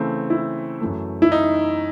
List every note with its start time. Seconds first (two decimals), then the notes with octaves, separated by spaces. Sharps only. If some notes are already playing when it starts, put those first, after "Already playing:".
Already playing: C#3 E3 A3 C4
0.30 E4
0.81 F#2 E3 A3
1.22 E4
1.32 D#4